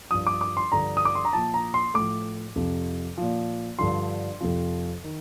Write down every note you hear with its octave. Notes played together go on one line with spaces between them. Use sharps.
G2 F3 D#6
D6
D6
C6
G2 D3 F3 A#5
D#6
D6
C6
A#5
A#2 F3 A5
A#5
C6
A2 F3 D6
F2 C3 F3
A#2 F3
G2 D3 F3 C6
F2 C3 F3
D#3